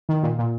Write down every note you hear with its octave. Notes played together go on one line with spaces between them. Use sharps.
D#3
A#2
A#2